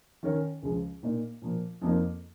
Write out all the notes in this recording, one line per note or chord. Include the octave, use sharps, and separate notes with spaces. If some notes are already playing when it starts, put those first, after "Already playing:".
D#3 C#4 A#4 C#5
C#2 C#3 F3 G#3
A#2 A#3 D#4
A#2 F3 A#3
F2 F3 A#3 D#4